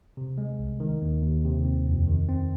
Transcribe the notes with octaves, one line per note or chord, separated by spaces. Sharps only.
C3
G#3
C2
D#3
D#2
D#2
C3
C4
F2
D#3
C4